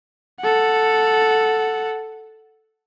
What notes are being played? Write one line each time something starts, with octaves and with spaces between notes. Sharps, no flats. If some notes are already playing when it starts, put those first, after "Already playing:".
A4 F#5